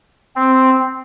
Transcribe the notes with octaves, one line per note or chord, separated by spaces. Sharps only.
C4